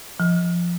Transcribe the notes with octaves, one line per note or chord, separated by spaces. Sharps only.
F3